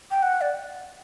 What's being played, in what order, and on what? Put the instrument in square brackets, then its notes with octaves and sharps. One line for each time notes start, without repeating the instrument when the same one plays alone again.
[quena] G5
F#5
D5